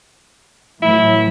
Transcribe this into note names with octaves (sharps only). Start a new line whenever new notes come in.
A2 E3 F#3 E4